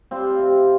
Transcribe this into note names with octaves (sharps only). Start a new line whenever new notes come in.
G3 C4 F4
C3